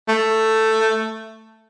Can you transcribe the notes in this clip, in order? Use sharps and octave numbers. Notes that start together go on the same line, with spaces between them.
A3